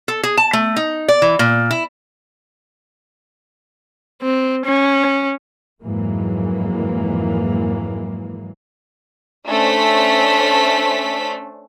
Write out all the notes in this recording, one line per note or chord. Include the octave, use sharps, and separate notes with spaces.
A4
G#4
A5
A3
D#4
D5
E3
A#2
E4
C4
C#4
F2 G#2 E3 F#3 G#3 A#3
A3 C#4 D4 C5 B6